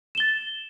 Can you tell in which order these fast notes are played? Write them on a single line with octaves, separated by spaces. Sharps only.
E7 G7 A6